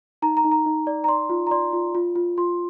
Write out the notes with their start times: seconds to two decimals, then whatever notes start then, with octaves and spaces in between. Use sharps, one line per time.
0.22 D#4 A#5
0.37 A#5
0.45 D#4
0.51 A#5
0.66 D#4
0.87 D5
1.04 A#5
1.08 D5 C6
1.29 F4
1.47 A#5
1.51 D5 C6
1.73 F4
1.95 F4
2.16 F4
2.37 F4 C6